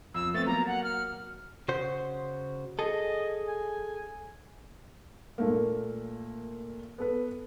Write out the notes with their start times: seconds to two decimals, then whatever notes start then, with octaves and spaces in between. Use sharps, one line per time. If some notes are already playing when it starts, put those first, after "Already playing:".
0.14 F2 E6
0.34 A3 B3 C4 A6
0.46 F#3 A#3 A#5
0.67 F#5
0.84 F6
1.68 C#3 F#4 C5
2.79 G#4 A4 D#5
3.47 G#5
5.38 A#2 A3 A#3
6.98 B3 A4 B4